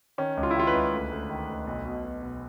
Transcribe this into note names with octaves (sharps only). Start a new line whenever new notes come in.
D#3 C#4
C#2
F4
E4
D#3 F4
B4
C#2
D2
D2
D#3
D2
B1
B2
B2
B2